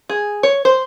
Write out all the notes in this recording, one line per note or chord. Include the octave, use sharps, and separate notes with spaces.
G#4
C#5
C5